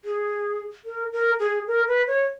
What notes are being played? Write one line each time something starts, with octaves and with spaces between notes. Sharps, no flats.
G#4
A#4
A#4
G#4
A#4
B4
C#5